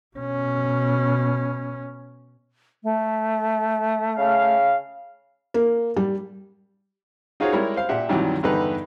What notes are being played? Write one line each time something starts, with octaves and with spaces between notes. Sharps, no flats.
B2 C#4
A3
C#3 F5
A#3
G3
D#4 F4 F#4 G#4 C5 C#5
G3 G#3 E4 A#4 C#5
C5 F5
A#2 G4 E5 F#5
C2 G2 D#3 E3 F#3 G3
E2 G2 D3 D#4 G4 B4